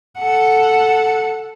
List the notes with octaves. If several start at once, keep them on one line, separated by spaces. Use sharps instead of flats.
A4 F#5